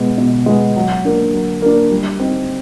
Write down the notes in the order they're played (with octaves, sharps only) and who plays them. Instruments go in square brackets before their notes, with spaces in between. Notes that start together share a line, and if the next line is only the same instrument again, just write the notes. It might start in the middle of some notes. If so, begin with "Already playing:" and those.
Already playing: [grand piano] B2 G#3 B3
B2
G#3 B3
F#3
A#3 D4
F#3
A#3 D4
G3
C4 D#4